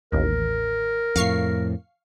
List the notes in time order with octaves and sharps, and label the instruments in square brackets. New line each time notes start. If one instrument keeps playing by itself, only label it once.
[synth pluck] A1 D#2 [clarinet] A#4
[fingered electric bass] F2 A2 [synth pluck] F5 C#6 C7